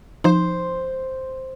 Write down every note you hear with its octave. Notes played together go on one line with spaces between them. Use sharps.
F3 D#4 C5